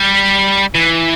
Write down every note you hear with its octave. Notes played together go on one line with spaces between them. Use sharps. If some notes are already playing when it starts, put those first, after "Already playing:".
Already playing: G3
E3